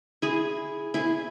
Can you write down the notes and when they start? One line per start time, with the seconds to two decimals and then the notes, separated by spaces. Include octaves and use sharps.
0.22 E4 G#4
0.94 E4 G#4